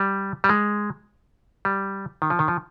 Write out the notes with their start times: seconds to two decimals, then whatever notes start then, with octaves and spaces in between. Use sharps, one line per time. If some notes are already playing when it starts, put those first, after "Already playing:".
Already playing: G3
0.44 G3
0.49 G#3
1.65 G3
2.22 D#3
2.30 F3
2.39 D#3
2.48 F3